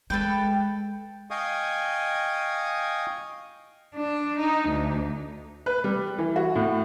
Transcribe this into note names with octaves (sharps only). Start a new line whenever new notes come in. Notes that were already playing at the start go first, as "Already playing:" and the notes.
G#3 A4 B4 G5
D#5 F5 G5 G#5 C#6 D#6
D4
D#4
D2
B4
G3
E3
F#4
A2